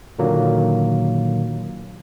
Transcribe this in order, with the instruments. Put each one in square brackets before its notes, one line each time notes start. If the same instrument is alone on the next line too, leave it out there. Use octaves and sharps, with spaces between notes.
[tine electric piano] A#2 D3 D#3 F#3 A#3